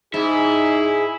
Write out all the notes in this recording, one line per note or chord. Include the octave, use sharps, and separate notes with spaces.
G#2 D#4 E4 G#4